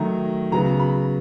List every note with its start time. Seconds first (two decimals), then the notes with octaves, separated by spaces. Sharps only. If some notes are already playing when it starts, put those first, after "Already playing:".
Already playing: D#3 F#3 A3 A#5
0.52 C#3 F#3 B3 A#5
0.80 B5